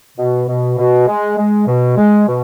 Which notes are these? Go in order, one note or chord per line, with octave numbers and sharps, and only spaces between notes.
B2
B2
B2
G#3
G#3
B2
G#3
B2